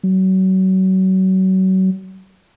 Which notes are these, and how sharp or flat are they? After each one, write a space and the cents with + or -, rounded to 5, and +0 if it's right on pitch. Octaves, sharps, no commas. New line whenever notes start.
F#3 +30